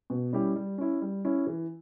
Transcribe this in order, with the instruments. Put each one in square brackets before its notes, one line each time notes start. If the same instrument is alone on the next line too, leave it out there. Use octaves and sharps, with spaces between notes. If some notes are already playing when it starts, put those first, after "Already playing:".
[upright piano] B2
G3 C#4 E4 G4
G3
C#4 E4
G3
C#4 E4
E3